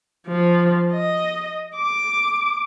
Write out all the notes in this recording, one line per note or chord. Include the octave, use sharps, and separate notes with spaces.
F3
D#5
D6